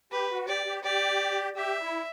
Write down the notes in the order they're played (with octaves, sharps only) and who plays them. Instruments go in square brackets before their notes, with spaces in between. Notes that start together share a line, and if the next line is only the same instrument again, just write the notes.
[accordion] G4 [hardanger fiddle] B4
[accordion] F#4
[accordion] G4 [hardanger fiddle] D5
[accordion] G4
[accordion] G4 [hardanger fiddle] D5
[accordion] G4 [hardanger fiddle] E5
[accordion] E4